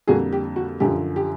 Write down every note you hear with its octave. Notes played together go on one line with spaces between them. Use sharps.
F2 D3 G3 A#3 F#4 G#4
G4
F#4
F#2 D3 F3 G4
G4